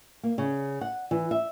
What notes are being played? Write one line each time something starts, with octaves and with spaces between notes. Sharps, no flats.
A#3
C#3
F#5
E3
E5